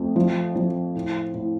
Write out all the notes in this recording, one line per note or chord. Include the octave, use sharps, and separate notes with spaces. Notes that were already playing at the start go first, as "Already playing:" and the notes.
Already playing: F2 A3
F3
F3
A2
A2